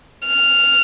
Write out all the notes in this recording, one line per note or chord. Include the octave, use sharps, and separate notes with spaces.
F6